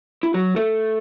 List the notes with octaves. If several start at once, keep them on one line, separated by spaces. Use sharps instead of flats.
E4
F#3 F#4
A3 A4